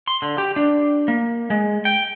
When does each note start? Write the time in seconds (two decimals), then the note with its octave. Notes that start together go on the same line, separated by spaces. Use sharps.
0.08 C6
0.22 D3
0.38 G4
0.56 D4
1.08 A#3
1.50 G#3
1.85 G5